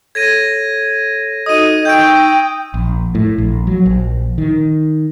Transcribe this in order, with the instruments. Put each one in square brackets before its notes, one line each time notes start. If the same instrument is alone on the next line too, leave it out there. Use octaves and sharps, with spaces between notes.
[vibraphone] A4 C#5 [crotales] G#6 A#6 D#7
[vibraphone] D#4 F#4 A4 [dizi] D#5 [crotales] D#6 D#7
[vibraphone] D#4 C#6 E6 [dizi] G5 [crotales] G6 D7
[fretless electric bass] A#1
A2
A#1
F#3
A#1
D#3